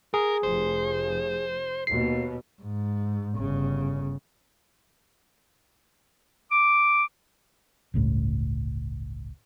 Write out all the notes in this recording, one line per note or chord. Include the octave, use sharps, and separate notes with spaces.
G#4 A#4
F1 C5
D#2 B2 C7
G#2
G1 C#3
D6
G1 C#2 A2